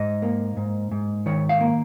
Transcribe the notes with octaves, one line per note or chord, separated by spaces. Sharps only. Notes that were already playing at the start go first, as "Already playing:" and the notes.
Already playing: G#2 D#5
A#3
G#2
G#2
D#3 C#5
F5
A#3